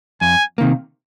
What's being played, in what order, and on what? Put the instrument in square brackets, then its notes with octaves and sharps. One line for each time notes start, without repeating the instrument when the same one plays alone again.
[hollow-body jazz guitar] F2 [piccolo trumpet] G#5
[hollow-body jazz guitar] C3 D#3 A#3